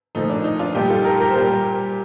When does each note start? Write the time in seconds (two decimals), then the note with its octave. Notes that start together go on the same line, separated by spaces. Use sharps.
0.15 A#2 F3 A3 D#4
0.29 D4
0.44 D#4
0.59 D4 F4
0.75 A#2 G3 D#4 G4
0.90 F4 A4
1.05 G4 A#4
1.20 G4 A#4
1.29 C5
1.35 A#2 G3 G4 A#4